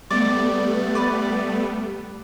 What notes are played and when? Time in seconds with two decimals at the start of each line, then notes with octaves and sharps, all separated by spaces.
0.11 G3 A3 B3 D5
0.95 B4 D5